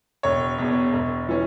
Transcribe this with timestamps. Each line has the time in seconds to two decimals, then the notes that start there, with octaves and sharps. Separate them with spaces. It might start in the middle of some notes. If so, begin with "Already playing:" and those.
0.23 E1 C#5
0.58 E2 B2
0.93 E1
1.28 E3 C#4